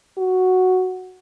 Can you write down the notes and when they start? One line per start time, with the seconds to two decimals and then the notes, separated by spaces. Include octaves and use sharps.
0.18 F#4